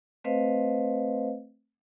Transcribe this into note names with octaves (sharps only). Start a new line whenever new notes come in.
A3 C4 B4 C5 D#5 F5